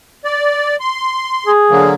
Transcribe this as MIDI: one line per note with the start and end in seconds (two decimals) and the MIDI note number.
0.25 0.76 74
0.80 1.51 84
1.47 1.92 68
1.70 1.94 50
1.70 1.94 54
1.70 1.94 58